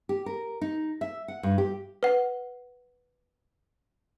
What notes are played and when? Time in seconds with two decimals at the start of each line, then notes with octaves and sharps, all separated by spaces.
0.09 G4
0.26 A#4
0.61 D#4
1.01 E5
1.28 F#5
1.43 G2
1.58 G4
2.03 B4 F#5